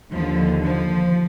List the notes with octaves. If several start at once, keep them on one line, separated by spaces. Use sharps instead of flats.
D#2 D3 F3
F3